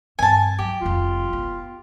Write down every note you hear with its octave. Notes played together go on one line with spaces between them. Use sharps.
G2 C4 G#5 A5
F#3 G4
F1 G3 F4
B3